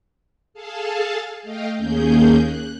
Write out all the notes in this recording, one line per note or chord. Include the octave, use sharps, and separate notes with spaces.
G#4 A4 F5 A5
A3 D#5 F5 G5
D#2 A#3 C#4 G#4 G6
F#6